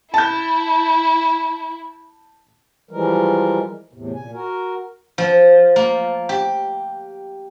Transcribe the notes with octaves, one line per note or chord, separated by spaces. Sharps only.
E4 A5 G6
E3 F3 G3 G#3 A#4
E2 A2 C3
A#2 G#5
F#4 A#4
F3
A#3
G4